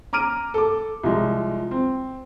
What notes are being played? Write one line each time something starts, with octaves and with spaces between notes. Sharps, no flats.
A#5 D6 F6 D7 D#7
A4 D6
C2 F3 G#3
C4